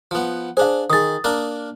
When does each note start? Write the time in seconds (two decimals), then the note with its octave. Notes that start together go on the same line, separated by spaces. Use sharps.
0.11 F3 B3
0.57 D4 G#4 C5 F5
0.90 D#3 G#4 D#6 A6
1.24 A#3 D4 A#4